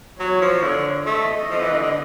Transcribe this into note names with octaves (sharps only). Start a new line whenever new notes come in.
F#3 C#5
F3
D3
A3 D#5
F3
E3
D3
D3